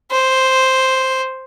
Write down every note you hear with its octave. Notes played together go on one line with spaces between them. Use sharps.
C5